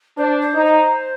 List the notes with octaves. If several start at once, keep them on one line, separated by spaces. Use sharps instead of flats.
D4 C5
C5
D#4
C5